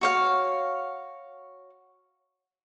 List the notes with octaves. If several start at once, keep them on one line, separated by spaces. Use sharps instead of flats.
F#4 C#5 F5